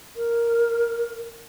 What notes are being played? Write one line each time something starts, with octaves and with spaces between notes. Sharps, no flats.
A#4